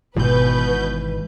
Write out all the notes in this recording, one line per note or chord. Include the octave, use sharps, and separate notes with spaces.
G#1 G#2 B2 E3 B4 G6